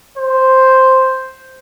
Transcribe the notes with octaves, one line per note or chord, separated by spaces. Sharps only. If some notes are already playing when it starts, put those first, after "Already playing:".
C5